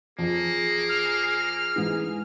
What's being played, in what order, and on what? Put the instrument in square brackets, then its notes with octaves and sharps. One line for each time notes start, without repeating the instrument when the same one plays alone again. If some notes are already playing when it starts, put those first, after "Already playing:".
[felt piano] F2 [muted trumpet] A#3 [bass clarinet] G#4
[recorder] F6
[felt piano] G#2 E3 [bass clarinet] G#4